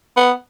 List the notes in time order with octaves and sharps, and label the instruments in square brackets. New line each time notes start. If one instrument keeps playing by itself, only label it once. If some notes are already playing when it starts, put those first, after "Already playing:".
[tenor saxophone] B3